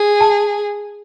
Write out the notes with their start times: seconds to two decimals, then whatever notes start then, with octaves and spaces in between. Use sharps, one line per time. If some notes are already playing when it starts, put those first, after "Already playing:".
Already playing: G#4
0.21 A5